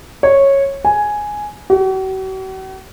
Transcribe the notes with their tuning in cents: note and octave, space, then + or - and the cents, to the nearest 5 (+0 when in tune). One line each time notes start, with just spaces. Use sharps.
C#5 -10
G#5 +5
F#4 +45